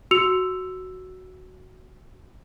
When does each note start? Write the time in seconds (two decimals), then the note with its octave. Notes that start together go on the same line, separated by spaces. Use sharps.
0.11 F#4 E6 C#7 F7